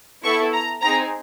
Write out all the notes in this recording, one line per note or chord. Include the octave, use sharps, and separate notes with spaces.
B3 E4 A4 C#6
A#5
C4 D#4 G#4 A#5